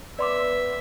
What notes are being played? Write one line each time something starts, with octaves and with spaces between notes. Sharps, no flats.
B3 D5 E5 C6 D6